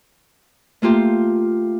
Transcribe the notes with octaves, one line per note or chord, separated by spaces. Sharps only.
A3 A#3 F4 G4